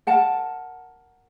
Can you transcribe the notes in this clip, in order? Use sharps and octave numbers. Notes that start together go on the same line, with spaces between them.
A#4 F#5 A5